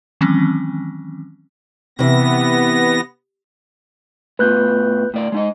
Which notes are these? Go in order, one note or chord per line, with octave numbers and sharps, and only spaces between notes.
D#3 E3 F#3 G#3 C4 C#4
C3 E3 B3 A#6
A2 B3 F4 B4 F#6 G6
A2 D5
G#3 D#4 D#5